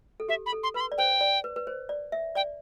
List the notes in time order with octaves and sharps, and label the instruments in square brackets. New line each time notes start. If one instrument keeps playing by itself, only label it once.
[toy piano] A4
[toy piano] G4 [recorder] E5
[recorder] B5
[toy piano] A4
[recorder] C6
[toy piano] B4 [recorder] B5
[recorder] C6
[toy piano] D5
[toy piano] C5 [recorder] G5
[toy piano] D5
B4
B4
C5
D5
E5
[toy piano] D5 [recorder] G5